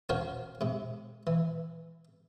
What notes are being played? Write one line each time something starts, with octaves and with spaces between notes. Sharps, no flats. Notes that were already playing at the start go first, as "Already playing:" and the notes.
C#4 F4 F#4 A#4 C5 C#5
G#2 C3
E3